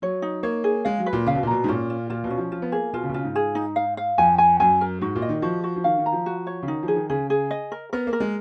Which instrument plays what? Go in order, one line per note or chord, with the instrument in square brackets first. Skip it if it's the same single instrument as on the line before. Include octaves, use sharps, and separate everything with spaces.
[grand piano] F#3 [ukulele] C#5
[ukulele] D#4
[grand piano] A#3 [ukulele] C#5
[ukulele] G#4
[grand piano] G#3 [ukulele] F5
[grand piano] F#3
[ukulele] B4
[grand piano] A#2
[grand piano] C#3 [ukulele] F5
[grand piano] B2
A#2
[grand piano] B2 [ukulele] A#5
[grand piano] G#2
[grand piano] A#2 [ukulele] C#4
[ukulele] F4
[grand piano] A#2 [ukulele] F4
[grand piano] B2
[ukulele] C#4
[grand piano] F3
[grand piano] F3 [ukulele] F4
[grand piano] B3
[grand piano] A#3 [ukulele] G#4
[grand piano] B2 [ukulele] F4
[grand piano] C#3
B2
[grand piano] C#3 [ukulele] F4
[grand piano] G#2
[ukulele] G#4
D#4
F5
F5
[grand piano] F2 [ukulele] G#5
[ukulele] G#5
[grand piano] F#2 [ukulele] G#5
[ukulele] A#4
[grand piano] G#2 [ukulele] F#4
[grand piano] A#2
[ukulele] D#5
[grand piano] D#3
[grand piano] F3 [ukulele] F#4
[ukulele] F#4
[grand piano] F3
[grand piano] D#3 [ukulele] F5
[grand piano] D#3
[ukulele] A#5
[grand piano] F3
[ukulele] F#4
C#5
[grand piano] C#3
[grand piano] D#3 [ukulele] D#4
[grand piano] F3
[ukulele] G#4
[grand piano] D#3
[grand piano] C#3 [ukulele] G#4
[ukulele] G#4
D#5
A#4
[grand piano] B3 [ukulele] A#4
[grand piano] A#3
[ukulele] A#4
[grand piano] G#3